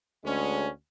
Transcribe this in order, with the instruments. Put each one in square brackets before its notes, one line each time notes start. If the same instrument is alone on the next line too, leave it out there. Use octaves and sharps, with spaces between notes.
[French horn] D2 [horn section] G#3 C#4